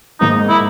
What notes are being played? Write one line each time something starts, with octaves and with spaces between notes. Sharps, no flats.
G#2 D#3 A#3 D#4
E4